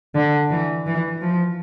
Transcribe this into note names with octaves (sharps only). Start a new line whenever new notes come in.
D3
E3
E3
F3